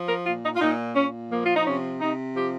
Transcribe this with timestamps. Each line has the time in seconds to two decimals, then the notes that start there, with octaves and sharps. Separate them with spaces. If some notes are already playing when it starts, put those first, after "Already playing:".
Already playing: F3
0.09 A#4
0.26 A#2 F4
0.44 D#4
0.56 F4
0.61 A#2 D#4
0.96 A#2 C#4
1.31 F3 A#3
1.46 F4
1.56 D#4
1.66 C3 C#4
2.01 C3 D#4
2.36 F3 G4